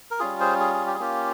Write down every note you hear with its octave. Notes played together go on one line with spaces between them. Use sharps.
A#4
G3 C#4 F4 G#4
G#4 C5
G#4
G#4
G4
G#4
A#3 C#4 F4 G4